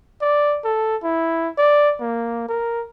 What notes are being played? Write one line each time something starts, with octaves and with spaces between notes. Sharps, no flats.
D5
A4
E4
D5
A#3
A#4